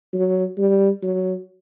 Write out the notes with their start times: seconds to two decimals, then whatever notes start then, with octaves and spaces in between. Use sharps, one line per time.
0.13 F#3
0.58 G3
1.02 F#3